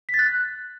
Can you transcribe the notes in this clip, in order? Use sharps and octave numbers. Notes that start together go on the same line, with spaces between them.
B6
A6
F#6